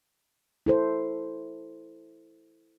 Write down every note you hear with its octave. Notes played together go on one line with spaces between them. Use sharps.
E4 A4 C5